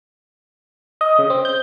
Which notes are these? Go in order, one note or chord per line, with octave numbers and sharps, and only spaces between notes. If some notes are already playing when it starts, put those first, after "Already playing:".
D#5
C#3
C4
G6